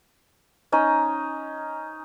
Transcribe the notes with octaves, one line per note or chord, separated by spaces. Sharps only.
C#4 D#4 D#5